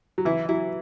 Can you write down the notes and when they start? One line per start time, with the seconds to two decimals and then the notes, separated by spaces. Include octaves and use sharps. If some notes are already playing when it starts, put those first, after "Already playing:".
0.18 F#3
0.25 E3 E4
0.49 F#3 E4